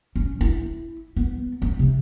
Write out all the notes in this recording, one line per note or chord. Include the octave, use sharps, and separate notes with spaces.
C#4
E4
B3
C4
C3